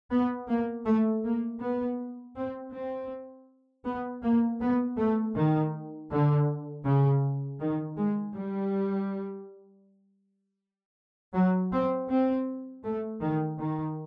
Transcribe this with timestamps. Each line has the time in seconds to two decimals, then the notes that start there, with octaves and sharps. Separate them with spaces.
0.11 B3
0.48 A#3
0.86 A3
1.24 A#3
1.60 B3
2.36 C4
2.73 C4
3.85 B3
4.23 A#3
4.61 B3
4.98 A3
5.36 D#3
6.11 D3
6.85 C#3
7.60 D#3
7.97 G#3
8.34 G3
11.34 F#3
11.72 C4
12.09 C4
12.84 A3
13.21 D#3
13.59 D#3